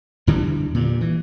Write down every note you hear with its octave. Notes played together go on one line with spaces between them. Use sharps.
E2 D3 E3 G3
G2 A#2
E3